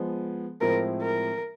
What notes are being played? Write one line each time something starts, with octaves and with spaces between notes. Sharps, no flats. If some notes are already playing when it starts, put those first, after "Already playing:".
Already playing: F3 G#3 B3
A2 F3 G#3 C4 E4 A#4
A#4